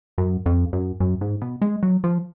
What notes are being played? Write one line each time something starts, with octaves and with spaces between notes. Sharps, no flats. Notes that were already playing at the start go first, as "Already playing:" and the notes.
F#2
F2
F#2
F#2
G#2
B2
G#3
F#3
F3